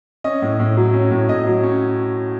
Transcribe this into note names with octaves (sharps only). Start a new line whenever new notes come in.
C#4 D#5
A2
A2
F#3
C#4
A2
A2 D#5
F#3
C#4